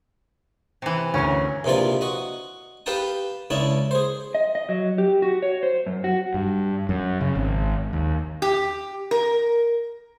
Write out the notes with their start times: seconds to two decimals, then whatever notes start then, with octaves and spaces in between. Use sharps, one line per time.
0.82 C3 E3
1.14 D2 C#4 A#4
1.64 A#1 C3 E3 F4 D5
2.01 F#4 D#5
2.86 G4 B4 F5 G5 A5 D#6
3.50 C#2 C#4 D4 E4 A5
3.91 G#4 C5
4.35 D#5
4.55 D#5
4.69 F#3
4.98 G4
5.22 F#4
5.42 C#5
5.63 C5
5.86 F#2
6.04 F#4
6.34 G2
6.89 F#2
7.21 C#3
7.35 G#1
7.93 D#2
8.42 G4
9.11 A#4